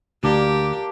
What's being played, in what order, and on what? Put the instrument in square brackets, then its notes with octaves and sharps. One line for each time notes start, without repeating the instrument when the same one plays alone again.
[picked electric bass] D2 [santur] A#3 D4 [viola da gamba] G4